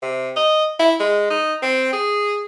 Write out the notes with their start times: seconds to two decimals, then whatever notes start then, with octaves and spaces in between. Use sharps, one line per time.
0.02 C3
0.37 D#5
0.79 E4
1.00 G#3
1.30 D#4
1.62 C4
1.93 G#4